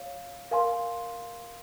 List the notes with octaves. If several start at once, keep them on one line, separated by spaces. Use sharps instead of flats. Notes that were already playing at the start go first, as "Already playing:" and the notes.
Already playing: C#5 F5
A#4 F5 G#5 C6